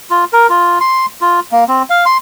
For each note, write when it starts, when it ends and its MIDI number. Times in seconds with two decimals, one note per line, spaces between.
0.10 0.24 65
0.33 0.47 70
0.49 0.79 65
0.80 1.06 84
1.21 1.40 65
1.52 1.64 58
1.68 1.83 60
1.90 2.05 77
2.06 2.17 84